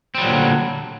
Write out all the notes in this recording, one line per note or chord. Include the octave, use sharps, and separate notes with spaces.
A#2 D3 F#3 G3 C4